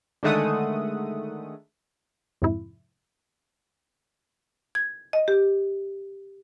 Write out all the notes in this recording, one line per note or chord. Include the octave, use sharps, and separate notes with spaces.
D3 D#3 G#3 A3 F#5 D#6
F2 G#2 C3 E4
G#6
D#5
G4